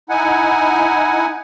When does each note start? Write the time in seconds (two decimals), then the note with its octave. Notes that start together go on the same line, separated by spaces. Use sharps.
0.09 D#4 E4 F#5 G#5